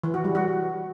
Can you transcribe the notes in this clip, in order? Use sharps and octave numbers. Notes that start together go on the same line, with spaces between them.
E3
F#4
G3
F#4